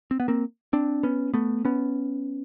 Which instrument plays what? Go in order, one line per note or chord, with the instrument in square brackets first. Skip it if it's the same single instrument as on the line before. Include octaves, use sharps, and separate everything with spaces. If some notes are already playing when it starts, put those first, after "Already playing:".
[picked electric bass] C4
B3
A#3 C4
C4 D4
B3 C#4
A3 B3
B3 C#4